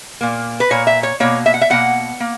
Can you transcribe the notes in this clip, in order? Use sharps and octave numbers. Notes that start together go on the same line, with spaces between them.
A#2 A#3
B4
A#2 A#3 C#5
E5
C#5
B2 A#3 C#5
E5
F#5
E5
B2 A#3 F#5
A#3